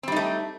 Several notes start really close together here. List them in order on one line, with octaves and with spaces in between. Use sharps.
C4 G3 D#4 A3